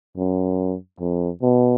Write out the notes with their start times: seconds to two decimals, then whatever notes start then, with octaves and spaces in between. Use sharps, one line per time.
0.17 F#2
1.00 F2
1.42 B2